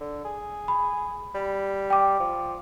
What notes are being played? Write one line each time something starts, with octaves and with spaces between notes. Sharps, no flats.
D3
G#4
B5
G3
G5 D6
F3